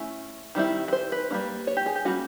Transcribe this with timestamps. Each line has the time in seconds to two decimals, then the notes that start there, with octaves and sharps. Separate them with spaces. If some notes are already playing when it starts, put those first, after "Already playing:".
Already playing: A3 C#4 E4
0.55 D#3 G3 C4 E4
0.88 B4
0.93 C5
1.12 B4
1.30 G3 A#3 C#4
1.67 C#5
1.77 G4
1.86 G#4
1.95 G4
2.05 G3 A#3 C#4 F#4